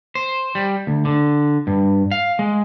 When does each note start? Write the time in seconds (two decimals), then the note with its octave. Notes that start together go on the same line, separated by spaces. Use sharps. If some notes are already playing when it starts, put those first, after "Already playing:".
0.15 C5
0.55 G3
0.87 D2
1.05 D3
1.67 G2
2.11 F5
2.39 G#3